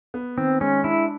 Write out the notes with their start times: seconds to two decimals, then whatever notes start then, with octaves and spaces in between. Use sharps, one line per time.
0.14 B3
0.37 D#3 C4
0.61 G#3 C#4
0.84 D4 E4